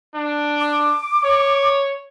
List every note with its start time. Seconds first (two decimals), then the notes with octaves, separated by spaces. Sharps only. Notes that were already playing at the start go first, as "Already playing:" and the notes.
0.15 D4
0.61 D6
1.24 C#5